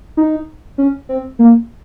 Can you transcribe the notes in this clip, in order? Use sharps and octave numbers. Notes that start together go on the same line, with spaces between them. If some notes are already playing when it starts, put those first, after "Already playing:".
D#4
C#4
C4
A#3